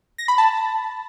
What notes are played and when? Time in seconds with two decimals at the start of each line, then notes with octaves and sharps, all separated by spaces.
0.18 A#6
0.28 B5
0.38 A5